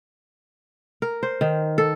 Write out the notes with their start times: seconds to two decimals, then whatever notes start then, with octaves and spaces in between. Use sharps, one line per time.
1.02 A#4
1.23 C5
1.41 D#3
1.78 A4